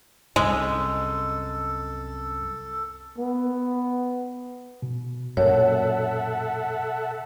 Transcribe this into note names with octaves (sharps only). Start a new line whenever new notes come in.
C2 F#2 G#3 A4
B3
B2
F#2 A#2 A4 C#5 E5 F#5